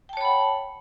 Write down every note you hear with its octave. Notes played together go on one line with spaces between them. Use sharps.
C#5 F#5 G5 A5 B5